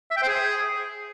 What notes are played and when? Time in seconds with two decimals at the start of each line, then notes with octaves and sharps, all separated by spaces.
0.11 E5
0.17 G5
0.23 C5
0.28 G#4